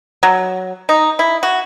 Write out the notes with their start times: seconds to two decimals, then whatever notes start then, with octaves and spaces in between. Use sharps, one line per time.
0.23 F#3
0.89 D#4
1.19 E4
1.43 F#4